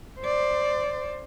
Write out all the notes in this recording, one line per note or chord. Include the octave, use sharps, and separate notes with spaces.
C5 D5